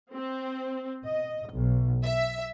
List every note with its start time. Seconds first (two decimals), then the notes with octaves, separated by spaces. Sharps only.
0.15 C4
1.04 D#5
1.52 B1
2.05 E5